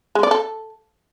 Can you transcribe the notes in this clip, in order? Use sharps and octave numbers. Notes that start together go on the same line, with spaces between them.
G#3
D5
A4